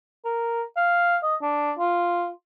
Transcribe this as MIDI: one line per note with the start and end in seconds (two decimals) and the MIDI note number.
0.25 0.63 70
0.77 1.17 77
1.23 1.35 75
1.42 1.72 62
1.79 2.29 65